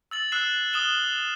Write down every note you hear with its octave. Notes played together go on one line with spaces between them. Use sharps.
E6 A6 F#7
E6 F#6 C7 E7
D#6 F6 E7 G7